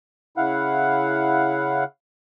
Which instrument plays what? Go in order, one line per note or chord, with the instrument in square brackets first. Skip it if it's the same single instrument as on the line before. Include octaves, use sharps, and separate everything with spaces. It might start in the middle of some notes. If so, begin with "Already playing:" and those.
[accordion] C#3 E4 F5 F#5